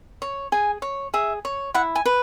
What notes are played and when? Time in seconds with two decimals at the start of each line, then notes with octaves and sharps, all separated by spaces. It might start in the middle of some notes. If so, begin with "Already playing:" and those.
0.22 C#5
0.52 G#4 G#5
0.82 C#5
1.14 G#4 E5
1.45 C#5
1.74 E4 F#5
1.95 G#5
2.05 B4